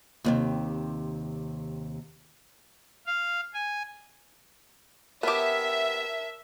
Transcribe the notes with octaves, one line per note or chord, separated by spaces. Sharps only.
D#2 A2 C3
F5
G#5
B3 G4 A#4 C#5 E5 A5